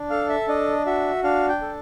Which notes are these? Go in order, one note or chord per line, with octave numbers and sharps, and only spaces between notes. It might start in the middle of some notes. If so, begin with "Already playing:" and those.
Already playing: D4
A4 F5
E5
D4 D#5
F#4 E5
D4 F5
G5
A4